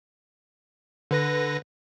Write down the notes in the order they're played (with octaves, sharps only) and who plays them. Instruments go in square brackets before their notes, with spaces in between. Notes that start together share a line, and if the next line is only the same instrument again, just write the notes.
[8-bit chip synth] D3 B4 A#6